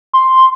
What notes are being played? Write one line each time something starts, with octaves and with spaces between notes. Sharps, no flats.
C6